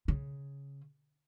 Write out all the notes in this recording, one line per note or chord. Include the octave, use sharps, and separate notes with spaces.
C#3